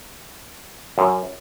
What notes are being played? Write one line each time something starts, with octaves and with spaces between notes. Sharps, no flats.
F#2